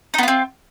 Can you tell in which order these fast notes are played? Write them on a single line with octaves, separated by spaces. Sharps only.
D#4 B3 F4 C4